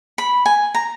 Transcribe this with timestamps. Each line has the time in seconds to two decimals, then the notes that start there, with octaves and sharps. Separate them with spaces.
0.18 B5
0.46 G#5
0.75 A#5